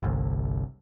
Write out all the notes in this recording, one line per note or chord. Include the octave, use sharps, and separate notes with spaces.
G1 C2